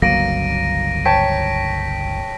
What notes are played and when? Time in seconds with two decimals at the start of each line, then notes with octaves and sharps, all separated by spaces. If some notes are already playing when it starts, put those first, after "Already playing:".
0.02 G1 C#2 F#3 A#3 A#6 D7 D#7
1.05 C#5 G5 A5 B6 D7